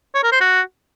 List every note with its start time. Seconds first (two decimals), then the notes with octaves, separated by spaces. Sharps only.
0.15 C#5
0.23 A#4
0.32 C5
0.41 F#4